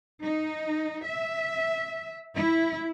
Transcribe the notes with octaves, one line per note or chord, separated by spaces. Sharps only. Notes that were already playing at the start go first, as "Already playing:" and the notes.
D#4
E5
E4